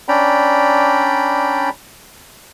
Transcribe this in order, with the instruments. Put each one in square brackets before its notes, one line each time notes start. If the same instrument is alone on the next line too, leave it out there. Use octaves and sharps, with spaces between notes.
[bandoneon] C#4 D4 D5 G5 A#5 B5